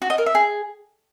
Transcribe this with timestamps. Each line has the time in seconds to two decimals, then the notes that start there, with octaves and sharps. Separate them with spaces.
0.02 F#4
0.10 D#5
0.18 A#4
0.26 E5
0.35 G#4